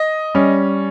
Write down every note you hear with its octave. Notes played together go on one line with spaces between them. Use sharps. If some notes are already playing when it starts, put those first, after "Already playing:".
Already playing: D#5
G3 C#4